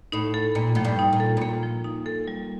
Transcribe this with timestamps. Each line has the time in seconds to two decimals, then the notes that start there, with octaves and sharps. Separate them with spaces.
0.12 A2 D#4
0.34 A4
0.55 A#2 A#3
0.75 A2 F3
0.85 G2
0.99 D#4
1.13 A#2
1.20 A4
1.37 A2
1.41 A#2 A#3
1.63 F3
1.84 D#4
2.06 A4
2.28 G3